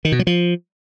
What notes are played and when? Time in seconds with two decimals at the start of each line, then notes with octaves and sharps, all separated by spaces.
0.05 D#3
0.12 B2
0.19 F#3
0.27 F3